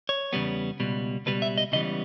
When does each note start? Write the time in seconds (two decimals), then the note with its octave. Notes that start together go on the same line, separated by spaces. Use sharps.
0.09 C#5
0.33 E2 C#3 G3 B3
0.80 C#2 B2 G3
1.26 C#2 B2 G3 B4
1.42 E5
1.58 D#5
1.72 C#2 C#3 E3 G3 B3 D#5